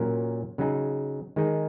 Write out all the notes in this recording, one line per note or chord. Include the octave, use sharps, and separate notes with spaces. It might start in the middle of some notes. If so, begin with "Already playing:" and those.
Already playing: A#2 F#3 C#4 A#4
C#3 F#3 D#4 G#4
D#3 G#3 D#4 G#4